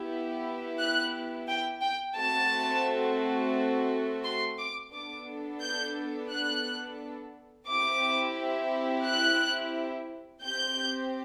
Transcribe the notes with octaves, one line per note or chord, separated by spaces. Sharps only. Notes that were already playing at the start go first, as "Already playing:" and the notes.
Already playing: B3 E4 G4
F#6
G5
G5
A3 C4 F#4 A4 A5
C6
D6
B3 D4 A4 D6
G6
F#6
C4 E4 G4 D6
F#6
C4 G4 G6